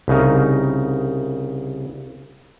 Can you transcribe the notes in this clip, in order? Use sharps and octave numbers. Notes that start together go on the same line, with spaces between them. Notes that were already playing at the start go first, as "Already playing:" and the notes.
C2 C#3 D#4